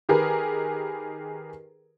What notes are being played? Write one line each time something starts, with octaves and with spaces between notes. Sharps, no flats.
D#3 G4 G#4 A#4 B4